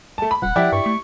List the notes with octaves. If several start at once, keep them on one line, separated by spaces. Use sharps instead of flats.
A3 A5
B5
D#1 F#5
F3 E4 G4 D5
G2 C#6
A3